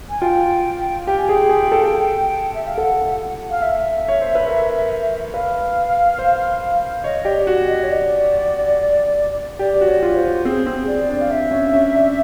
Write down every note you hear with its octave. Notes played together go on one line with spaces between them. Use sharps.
G#5
F4 G5
G4 G5
G#5
G#4 G5
G#4
A4
E5
F5
A4 F#5
F5
E5
C#5
C5
B4
A#4
B4 F5
C5
C#5 D#5
G4 D5
F#4
D#5
C#5
D5
G4 D5
F#4
C#5
F4
C5
C4 G#4
C4
D5
D4
F5
D4 E5
C#4
C#4
D4